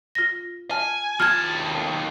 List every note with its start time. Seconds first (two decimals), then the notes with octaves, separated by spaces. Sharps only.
0.15 F4 A#6
0.71 G#5 A5 F6
1.20 D#2 F4 A5 F6 G#6